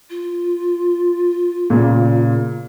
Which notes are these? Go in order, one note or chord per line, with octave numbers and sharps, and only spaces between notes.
F4
A#2 C#3